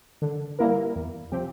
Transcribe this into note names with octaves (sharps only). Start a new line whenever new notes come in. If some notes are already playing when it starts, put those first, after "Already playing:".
D3
G3 A#3 E4 A#4
E2
C3 F3 C4 G4